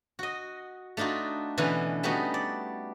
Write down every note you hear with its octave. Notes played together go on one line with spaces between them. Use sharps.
F#4 D#5
A3 D4 D#4 F4 F#4
B2 D3 E3 C#4 B4
G3 A3 B3 C#4 D#4 F#4
D5